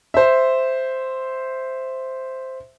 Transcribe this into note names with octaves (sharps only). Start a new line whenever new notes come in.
C5 E5